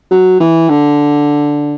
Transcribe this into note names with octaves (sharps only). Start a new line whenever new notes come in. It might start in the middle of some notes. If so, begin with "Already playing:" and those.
F#3
E3
D3